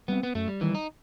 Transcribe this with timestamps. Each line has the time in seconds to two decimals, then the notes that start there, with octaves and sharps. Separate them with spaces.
0.08 G3 B3 C4
0.23 B3
0.35 F#2 A3
0.48 G3
0.61 D#3 E3 G3
0.75 D#4